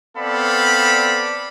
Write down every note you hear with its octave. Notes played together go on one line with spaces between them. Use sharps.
B3 C4 A4 D5 F5 B5